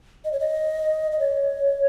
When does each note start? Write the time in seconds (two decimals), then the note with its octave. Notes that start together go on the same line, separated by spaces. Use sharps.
0.25 D#5
0.32 C#5
0.40 D#5
1.12 D#5
1.19 C#5